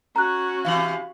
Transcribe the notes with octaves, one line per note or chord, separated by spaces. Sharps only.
C#4 F#4 A#5 F#6
C3 E3 F5 F#7